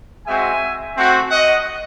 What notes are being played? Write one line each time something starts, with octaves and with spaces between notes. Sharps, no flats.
G#3 C4 F#4 E5 G#5
A3 C4 F#4
D#5 F#5